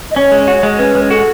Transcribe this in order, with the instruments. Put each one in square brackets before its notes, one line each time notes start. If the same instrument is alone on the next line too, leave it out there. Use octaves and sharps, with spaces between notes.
[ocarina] D#5
[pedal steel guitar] C#4 [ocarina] C#5
[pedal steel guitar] G#3
F#4
G#3
[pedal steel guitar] C#4 [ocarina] B4
[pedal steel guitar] G#3
[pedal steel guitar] F#4 [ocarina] A4